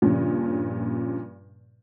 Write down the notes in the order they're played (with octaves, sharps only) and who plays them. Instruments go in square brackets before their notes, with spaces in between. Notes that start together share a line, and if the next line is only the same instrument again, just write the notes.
[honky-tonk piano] G2 A#2 C#3 F3